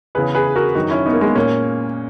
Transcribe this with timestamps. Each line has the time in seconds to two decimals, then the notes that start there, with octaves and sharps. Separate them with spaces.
0.15 E2 C#3 E3 G#4 B4
0.35 G#4 B4
0.56 F#4 A#4
0.75 F#2 D#3 D#4 F#4
0.91 C#4 E4
1.06 B3 D#4
1.13 A#3
1.21 G#3 B3
1.35 A#2 A#3 C#4